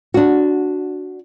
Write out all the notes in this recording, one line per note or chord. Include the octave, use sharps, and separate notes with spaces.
D4 F#4